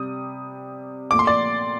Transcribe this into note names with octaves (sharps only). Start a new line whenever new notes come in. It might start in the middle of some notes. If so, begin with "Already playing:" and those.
Already playing: C3 G3 D#6
A#2 A3 D6
C6
D5 D6